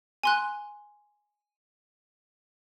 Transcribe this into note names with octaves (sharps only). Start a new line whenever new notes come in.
G#5 C6 F#6